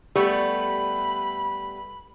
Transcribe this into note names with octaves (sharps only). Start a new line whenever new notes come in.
G3 A3 B3 G4 B5